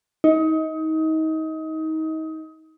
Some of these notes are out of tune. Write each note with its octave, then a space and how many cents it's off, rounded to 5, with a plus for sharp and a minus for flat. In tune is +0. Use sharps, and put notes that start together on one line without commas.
D#4 +25